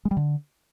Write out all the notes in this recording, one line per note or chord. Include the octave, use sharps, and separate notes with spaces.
G#3
G3
D3